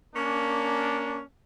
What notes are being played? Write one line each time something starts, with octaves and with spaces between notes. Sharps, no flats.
A#3 C#4 D4